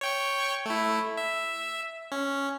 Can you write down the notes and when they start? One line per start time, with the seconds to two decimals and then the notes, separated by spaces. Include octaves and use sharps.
0.01 C#5 G5 C#6
0.66 A3 E4
1.17 E5
2.12 C#4